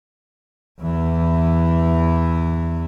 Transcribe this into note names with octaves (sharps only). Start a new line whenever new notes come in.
E2 E3